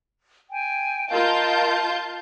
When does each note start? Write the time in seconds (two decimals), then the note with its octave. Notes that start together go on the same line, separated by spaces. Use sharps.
0.50 G5 G#5
1.10 F4 A#4 D#5 F5 A5 G6